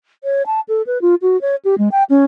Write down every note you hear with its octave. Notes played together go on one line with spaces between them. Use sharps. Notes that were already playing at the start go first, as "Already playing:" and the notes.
C#5
A5
A4
B4
F4
F#4
C#5
G4
G#3
G5
C#4